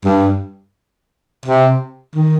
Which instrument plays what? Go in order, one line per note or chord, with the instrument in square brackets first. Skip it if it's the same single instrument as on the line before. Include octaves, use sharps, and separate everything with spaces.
[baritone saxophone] G2
C3
D#3